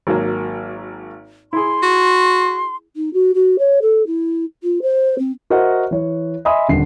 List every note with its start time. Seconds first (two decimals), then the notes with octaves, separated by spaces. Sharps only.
0.07 G#1 F#3 A#3
1.53 E4 G#4 C6
1.83 F#4
2.95 D#4
3.13 F#4
3.34 F#4
3.58 C#5
3.82 A4
4.06 E4
4.63 F4
4.82 C5
5.18 C4
5.50 F#4 A#4 C5 D#5 E5 F#5
5.91 E3 C#5
6.45 D#5 E5 G#5 B5 C6 D#6
6.69 D#1 D3 C7